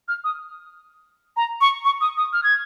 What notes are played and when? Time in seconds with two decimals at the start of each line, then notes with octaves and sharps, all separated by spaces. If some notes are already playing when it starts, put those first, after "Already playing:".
0.08 F6
0.24 D#6
1.37 A#5
1.61 C#6
1.85 C#6
2.01 D#6
2.17 D#6
2.33 F6
2.44 G#6